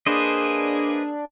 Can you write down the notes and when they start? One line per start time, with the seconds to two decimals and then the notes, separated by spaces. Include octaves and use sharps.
0.06 A#3 D4 G#4 B4 C5 D#5